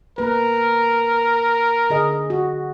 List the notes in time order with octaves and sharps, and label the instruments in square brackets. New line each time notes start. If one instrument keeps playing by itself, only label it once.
[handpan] A#3 B4 [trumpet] A#4
[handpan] D3 G#4 D#5
F#4